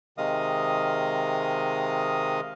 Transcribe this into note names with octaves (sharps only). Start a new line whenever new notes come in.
C3 D#3 G#3 D#5 F5 D#6